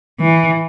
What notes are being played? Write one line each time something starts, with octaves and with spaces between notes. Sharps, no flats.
E3